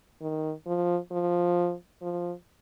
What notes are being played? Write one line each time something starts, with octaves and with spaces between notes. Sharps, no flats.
D#3
F3
F3
F3